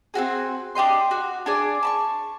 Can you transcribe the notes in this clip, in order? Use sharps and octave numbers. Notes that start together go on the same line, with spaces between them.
C4 C#4 F#4 G#4
D4 G4 D#5 C6
F#4
D4 G#4 D5
A5 B5 C#6